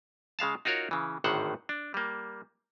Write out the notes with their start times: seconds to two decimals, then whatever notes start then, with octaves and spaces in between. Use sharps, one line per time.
0.39 C#3 G#3 F5 A5
0.65 D#4 F4 F#4 A#4 C#5
0.91 C#3 E3
1.24 G#1 A2 D3 D#3 C5 F#5
1.69 D4
1.94 G3 A#3